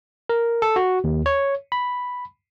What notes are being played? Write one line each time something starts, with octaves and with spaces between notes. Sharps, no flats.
A#4
A4
F#4
D#2
C#5
B5